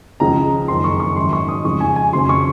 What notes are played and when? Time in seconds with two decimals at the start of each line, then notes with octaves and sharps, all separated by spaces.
0.20 C#2 C#3 F3 G#3 A#5
0.68 F#1 F2 D#3 C6
0.84 C#6
1.00 C#6
1.16 G#1 F#2 D#3 C6
1.33 C#6
1.49 D#6
1.64 F2 C#3 F3 G#3 C#6
1.80 G#5
1.96 G#5
2.13 F2 C#3 F#3 C6
2.29 C#6